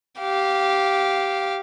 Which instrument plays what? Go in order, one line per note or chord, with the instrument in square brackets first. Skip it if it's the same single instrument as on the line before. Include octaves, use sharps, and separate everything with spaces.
[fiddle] G4 F5